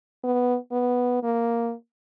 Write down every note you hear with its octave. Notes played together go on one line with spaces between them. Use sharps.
B3
B3
A#3